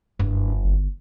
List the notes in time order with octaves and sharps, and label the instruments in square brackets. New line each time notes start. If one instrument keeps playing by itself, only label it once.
[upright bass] F#1 [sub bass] G2
[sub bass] G1